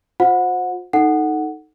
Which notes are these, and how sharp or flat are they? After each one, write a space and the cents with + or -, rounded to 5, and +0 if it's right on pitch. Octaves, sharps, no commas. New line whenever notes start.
F4 +40 C5 +0 F#5 -25
D#4 +0 A4 +5 F#5 +0